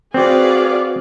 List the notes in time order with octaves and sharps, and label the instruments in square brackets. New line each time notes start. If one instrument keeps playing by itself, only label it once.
[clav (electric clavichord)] C4 [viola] F#4 D5 [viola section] G#4 B4 F5